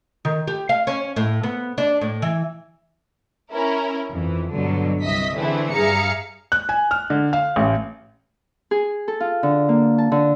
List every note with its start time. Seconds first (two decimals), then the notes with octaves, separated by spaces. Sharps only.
0.25 D#3
0.47 G4
0.69 F5
0.87 C#4
1.16 A2
1.43 B3
1.78 D4
2.01 A2
2.22 E3
3.52 C#4 E4 A#4
4.09 F2 E3
4.52 G2 B2 D3 F#3
5.02 C2 D#5 E5 B6
5.35 D3 E3 A3 C4 E4 G#4
5.71 G2 G#4 E5 F5 A#5 C#7
6.52 F#6
6.69 G#5
6.91 F6
7.10 D3
7.33 F5
7.56 A1
8.71 G#4
9.08 A4
9.20 F4
9.43 D3
9.69 A#3
9.98 A5
10.12 D3